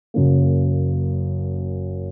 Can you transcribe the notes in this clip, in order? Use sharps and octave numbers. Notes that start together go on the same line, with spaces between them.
F#1 F#2 C#3 F#3 A#3